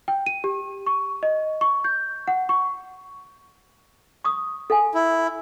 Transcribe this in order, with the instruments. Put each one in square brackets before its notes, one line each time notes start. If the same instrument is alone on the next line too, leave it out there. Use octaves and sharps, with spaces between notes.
[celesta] G5
D#7
G4
C#6
D#5
C#6
G6
F#5
C#6
[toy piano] C#6 D#6
A4 F5 G#5
[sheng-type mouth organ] E4